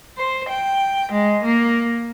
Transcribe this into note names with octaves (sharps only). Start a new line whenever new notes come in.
C5
G5
G#3
A#3